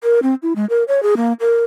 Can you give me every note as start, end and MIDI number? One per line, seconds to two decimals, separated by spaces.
0.03 0.20 70
0.23 0.35 60
0.43 0.53 64
0.56 0.65 56
0.70 0.84 70
0.88 1.02 73
1.03 1.15 68
1.17 1.33 58
1.40 1.64 70